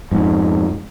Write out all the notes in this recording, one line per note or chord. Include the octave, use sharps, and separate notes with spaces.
F2 G#2